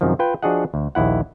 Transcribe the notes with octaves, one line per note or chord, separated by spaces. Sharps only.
F#2 C3 D#3 F3
F4 B4 G5
F3 D4 F#4 G#4 D#5 F#5
D2
A#1 D#2 E4 F#5